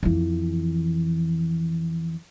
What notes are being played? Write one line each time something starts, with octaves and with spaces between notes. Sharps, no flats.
F2 E3